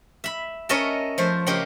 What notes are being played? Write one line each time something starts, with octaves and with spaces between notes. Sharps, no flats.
E5 B5
C#4 A#4 C#5 D#5 E5 A5
F3 A3 C5
C#3 A#3 G4 A#4 D#5